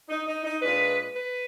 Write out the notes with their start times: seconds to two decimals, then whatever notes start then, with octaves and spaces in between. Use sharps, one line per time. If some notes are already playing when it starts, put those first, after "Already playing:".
0.09 D#4
0.27 D#4
0.44 D#4
0.62 A#2 G#3 D4 B4
1.13 B4